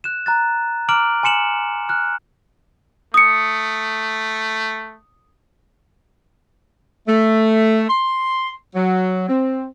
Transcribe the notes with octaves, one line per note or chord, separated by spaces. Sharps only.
F#6 E7
A#5 F#6 A6
A#5 D6 F6 D7 F#7
G#5 C6 C#7 E7 F#7
F6 F#6
A3 D#6 C#7
A3
C6
F#3
C4